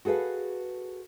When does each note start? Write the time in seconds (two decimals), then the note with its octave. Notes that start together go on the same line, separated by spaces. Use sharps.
0.05 F#4 G#4 A4 B4 F5